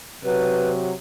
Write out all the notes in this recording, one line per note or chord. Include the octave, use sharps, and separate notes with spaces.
C3 F#3 B4